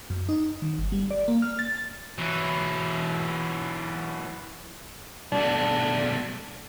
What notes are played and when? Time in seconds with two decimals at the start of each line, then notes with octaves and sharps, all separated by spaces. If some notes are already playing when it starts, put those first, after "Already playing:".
0.10 F#2
0.29 D#4
0.62 D#3
0.78 G1
0.92 G3
1.11 D5
1.28 A#3
1.42 F6
1.59 A6
2.18 E3 F#3
5.32 B1 A3 D4